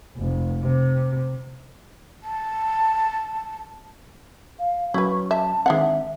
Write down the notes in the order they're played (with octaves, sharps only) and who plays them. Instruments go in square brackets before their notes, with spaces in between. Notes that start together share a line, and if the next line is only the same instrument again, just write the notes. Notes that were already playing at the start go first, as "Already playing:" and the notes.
[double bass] F1
C3
[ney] A5
[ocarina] F5
[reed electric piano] F#3 C#4 [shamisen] E4 B4 [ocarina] C#6
[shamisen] E5 [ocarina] A5
[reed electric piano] D#3 C4 [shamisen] G#3 D4 F#5 [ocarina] E5